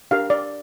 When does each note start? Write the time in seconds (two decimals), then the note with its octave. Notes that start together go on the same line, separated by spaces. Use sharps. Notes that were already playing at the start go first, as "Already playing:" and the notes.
0.11 D4 G4 A#4 F5
0.30 D5